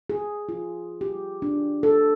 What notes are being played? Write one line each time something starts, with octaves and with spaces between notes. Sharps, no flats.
G#4
F4
G4
D4
A4